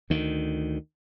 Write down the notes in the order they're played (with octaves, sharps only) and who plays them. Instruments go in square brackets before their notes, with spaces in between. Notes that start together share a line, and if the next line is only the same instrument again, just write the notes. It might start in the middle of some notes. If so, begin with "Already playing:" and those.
[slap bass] D2 D#3